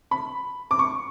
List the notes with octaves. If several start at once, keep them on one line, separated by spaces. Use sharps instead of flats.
B5
D6
C#6